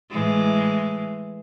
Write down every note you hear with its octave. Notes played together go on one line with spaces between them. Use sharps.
A2 E3 G#3